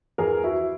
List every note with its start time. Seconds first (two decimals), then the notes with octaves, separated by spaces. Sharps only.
0.18 E2 G#4 A#4
0.44 E4 F#4